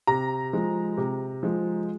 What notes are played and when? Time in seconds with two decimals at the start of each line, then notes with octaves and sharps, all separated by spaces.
0.07 C3 A#5
0.53 F3 G#3
0.97 C3
1.43 F3 G#3